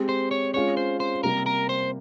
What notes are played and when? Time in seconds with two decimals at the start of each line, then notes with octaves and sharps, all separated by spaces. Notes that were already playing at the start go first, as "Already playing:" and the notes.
Already playing: G#3 C4 G4
0.09 C5
0.31 C#5
0.54 G#3 C#4 F4 C#5
0.77 C5
1.00 C5
1.23 C3 G3 A#3 A#4
1.46 A#4
1.69 C5